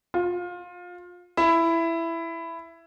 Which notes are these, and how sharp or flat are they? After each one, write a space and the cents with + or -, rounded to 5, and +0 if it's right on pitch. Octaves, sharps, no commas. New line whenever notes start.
F4 +25
E4 +10